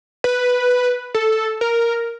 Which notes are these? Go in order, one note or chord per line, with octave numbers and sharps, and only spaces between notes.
B4
A4
A#4